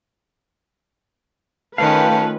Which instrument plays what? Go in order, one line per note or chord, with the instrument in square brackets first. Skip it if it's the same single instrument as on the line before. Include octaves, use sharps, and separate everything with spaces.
[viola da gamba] D#3 C#4 [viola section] A3 F4 B4 [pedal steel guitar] F5 G5 [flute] A5